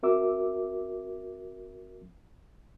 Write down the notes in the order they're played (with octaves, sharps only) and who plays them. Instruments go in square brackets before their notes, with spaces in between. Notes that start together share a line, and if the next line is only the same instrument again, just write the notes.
[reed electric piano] C4 F#4 A#4 E5 D6 E6